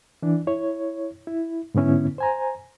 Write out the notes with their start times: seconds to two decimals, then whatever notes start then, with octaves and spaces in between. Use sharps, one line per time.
0.22 E3 D4
0.47 E4 C#5
1.27 E4
1.75 G#2 D3 B3 C#4 E4
2.18 C5 G#5 A#5